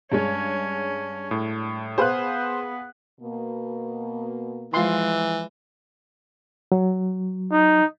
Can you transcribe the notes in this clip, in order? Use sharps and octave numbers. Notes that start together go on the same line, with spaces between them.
G2 G#3 C#4 C#5
A2
B3 G#4 B4 C5 F5 F#6
B2 A#3
E3 F3 G#3 F4 C6
F#3
D#4